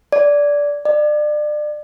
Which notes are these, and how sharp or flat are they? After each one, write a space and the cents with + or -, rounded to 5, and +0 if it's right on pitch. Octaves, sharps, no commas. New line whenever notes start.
D5 -15
D5 +30